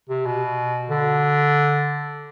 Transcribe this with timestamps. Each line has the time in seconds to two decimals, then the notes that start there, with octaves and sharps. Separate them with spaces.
0.09 C3
0.26 B2
0.90 D3